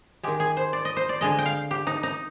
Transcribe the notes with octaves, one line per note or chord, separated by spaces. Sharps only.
D#3 G#3 G4
G#4
C5
D5
D#5
C5
D5
D3 G#3 D#5
G5
F5
G4
D#4
D#4